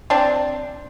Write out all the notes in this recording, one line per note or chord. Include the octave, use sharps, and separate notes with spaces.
C4 D4